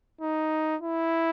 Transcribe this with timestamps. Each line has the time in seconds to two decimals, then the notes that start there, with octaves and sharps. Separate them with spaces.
0.21 D#4
0.81 E4